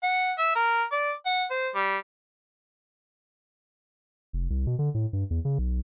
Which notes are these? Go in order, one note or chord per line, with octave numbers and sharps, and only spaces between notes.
F#5
E5
A#4
D5
F#5
C5
G3
F1
C2
B2
D3
A2
G2
E2
C#3
B1